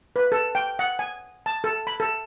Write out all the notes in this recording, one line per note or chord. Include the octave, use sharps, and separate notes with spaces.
B4
A4
G5
F#5
G#5
A5
A4
B5
A4